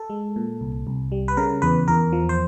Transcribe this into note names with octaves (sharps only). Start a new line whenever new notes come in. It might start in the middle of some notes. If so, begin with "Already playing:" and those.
Already playing: A4
G#3
A#2
C2
C2
G3
B4
C#3 A#4
E2 B4
E2 A#4
F3
C5